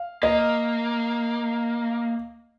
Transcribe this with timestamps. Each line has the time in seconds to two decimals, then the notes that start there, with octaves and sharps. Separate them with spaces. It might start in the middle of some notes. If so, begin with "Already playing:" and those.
Already playing: F5
0.23 A#3 D#5